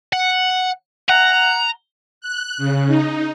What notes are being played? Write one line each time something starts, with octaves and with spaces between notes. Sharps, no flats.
F#5
F#5 A#5
F#6
C#3
D#4